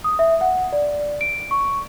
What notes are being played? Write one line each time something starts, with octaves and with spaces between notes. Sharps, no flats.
D#6
E5
F#5
D5
D7
C#6